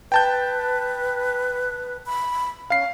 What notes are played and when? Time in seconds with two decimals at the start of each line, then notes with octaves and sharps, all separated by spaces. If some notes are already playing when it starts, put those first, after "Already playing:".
0.12 B4 G5 A5 G6
2.06 B5
2.70 C#4 F5 C7